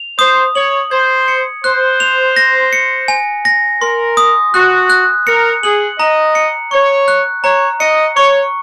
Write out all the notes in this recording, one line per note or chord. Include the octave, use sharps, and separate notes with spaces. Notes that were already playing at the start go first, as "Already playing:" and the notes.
Already playing: F7
C5 D#6
C#5 F#7
C5 G#6
C#7
C5 F#6
F7
A#6
C#7
G#5
A#6
A#4 C6
D#6
F#4 F#6
F#6
A#4 C#7
G#4 F#7
D#5 A#5
C#7
C#5 C#6
F#6
C#5 A#5
D#5 C#7
C#5 C#6